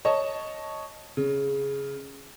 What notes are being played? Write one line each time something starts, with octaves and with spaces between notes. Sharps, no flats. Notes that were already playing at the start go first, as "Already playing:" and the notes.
C#5 D#5 A5 C#6
C#3